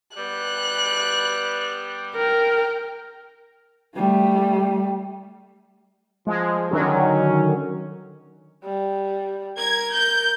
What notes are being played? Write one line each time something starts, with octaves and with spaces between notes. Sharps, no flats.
G3 B3 F#6
A#4 G5
G3 A3
F3 G#3
D3 D#3 F#3 C#4
G3
A#4 G#6
G6